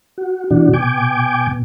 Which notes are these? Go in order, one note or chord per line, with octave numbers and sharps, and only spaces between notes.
F#4
B2 E3 D4 F#4
B2 G5 G#5 D6
B2